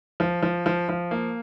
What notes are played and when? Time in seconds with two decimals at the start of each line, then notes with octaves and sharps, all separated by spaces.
0.20 F3
0.43 F3
0.66 F3
0.89 F3
1.11 A#3